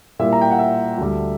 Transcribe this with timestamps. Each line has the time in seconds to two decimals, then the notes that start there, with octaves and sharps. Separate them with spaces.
0.19 A#2 G3 A#3 E4 E5
0.32 A#5
0.41 G5
0.50 F#5
0.58 E5
0.98 D2 D3 G3